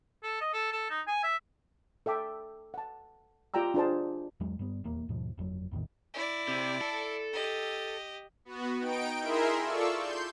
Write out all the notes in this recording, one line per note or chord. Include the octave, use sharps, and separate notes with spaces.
A4
D#5
A4
A4
D#4
G#5
E5
A4 E5 G5 D6
F#5 A5
F4 G4 D5 G5 A#5 E6
D4 F4 G#4 C5 A5
E2 F#3 G#3
G2 G3 B3
D#1 E2 A#3
D#2 G#2 B2 F3
G1 F2 D3 F#3
A#1 E2 A2 D#3
E4 D5
C3
A4
G4 D#5
B3 F#4
D#4 G5 D7
E4 G#4 A#4 E5 C6
F4 A4 D5 C#6 E6
C6 G6